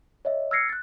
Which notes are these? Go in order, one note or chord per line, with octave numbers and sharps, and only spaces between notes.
C#5 D#5 E5
E6 F6 G#6 A#6 C7 C#7
F#6 A6